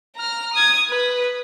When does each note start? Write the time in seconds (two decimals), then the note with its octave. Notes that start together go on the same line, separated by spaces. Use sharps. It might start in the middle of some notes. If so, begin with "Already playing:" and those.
0.17 A#5 F6
0.54 D#6 G#6
0.89 B4